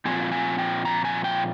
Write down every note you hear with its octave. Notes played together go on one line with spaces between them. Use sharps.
A#2 F3 C4 F4 G#5
G#5
G5
A#5
G#5
G5